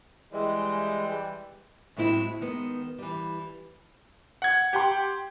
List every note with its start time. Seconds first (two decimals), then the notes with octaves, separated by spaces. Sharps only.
0.32 E3 G3 G#3
1.97 A2 F#3 G#3 C4 E4
2.41 D#3 G#3 B3
2.98 E3 G3
4.42 F#5 G#6
4.73 G4 G5 C6